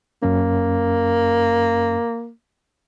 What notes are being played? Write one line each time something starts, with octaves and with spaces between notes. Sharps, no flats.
F#2 A#3 C#4